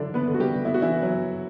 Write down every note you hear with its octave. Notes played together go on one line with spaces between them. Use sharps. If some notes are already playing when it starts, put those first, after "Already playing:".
Already playing: D3 F#3 D4 E4 D5
B3 B4
D3
F#4
G3 G4
B3 E4
F#4
E3 E4
F#3